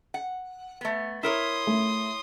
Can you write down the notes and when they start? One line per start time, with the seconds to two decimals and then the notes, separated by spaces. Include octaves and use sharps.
0.14 F#5
0.81 A3 B3
1.23 E4 A#4 C#5 C6 D#6
1.67 A3